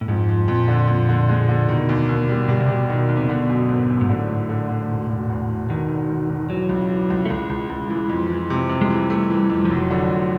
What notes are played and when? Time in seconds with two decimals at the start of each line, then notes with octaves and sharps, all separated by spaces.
0.01 A2
0.08 F2 G#2
0.29 F3
0.48 F2 A#2
0.68 D3
0.88 F2
1.09 D3
1.29 G#3
1.49 D3
1.68 B2 D#3
1.89 D#2
2.09 D#2
2.29 G3
2.48 B2 G3
2.60 C3
2.69 B2 G3
2.89 B2 D#3
3.09 D#2
3.17 C3
3.29 B2 D3
3.49 F#2
3.68 G#1
3.90 F#2
4.01 G#2
4.09 A2 D3
4.29 G#1
4.49 D3
4.69 D3
4.89 E1
5.10 E1
5.30 E2
5.49 E1
5.69 B2 D#3
5.89 E1
6.09 E1
6.29 E1
6.50 E3 F#3
6.69 C#2
6.90 E3
7.10 C#2
7.25 A3
7.30 C#2 G#3
7.50 C#2
7.69 C#2
7.90 E3
8.09 F2
8.30 E3
8.50 C3
8.69 C3
8.81 G#3
8.90 E3 G3
9.10 A3
9.30 E3
9.50 F2
9.65 F3
9.69 F1 F#3
9.90 D3
10.11 F1